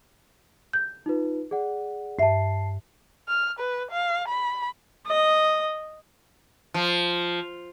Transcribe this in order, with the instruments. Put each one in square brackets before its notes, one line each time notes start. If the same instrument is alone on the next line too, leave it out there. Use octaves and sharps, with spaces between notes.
[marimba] G6
[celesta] D#4 F4 B4
G#4 D5 F#5
[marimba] G2 E5 [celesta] A5 C7
[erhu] F6
B4
F5
B5
[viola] D#5
[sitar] F3